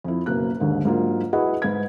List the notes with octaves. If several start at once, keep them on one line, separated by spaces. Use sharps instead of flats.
F2 E4
F#1 B2 A#3 F#6
D#2 G#2 D3
G#2 F#3 A#3 D4 F4
E4 F#4 G#4 B4 D#5 F#5
G#2 B4 G#6